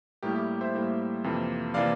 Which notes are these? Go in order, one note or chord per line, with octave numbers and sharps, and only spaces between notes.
A2 G3 A#3 E4 G4 A#4
G4
C5 E5
A2 G3 A#3 E4
F2 C3 E3 A#3
C3 E3 A#3 D5 F5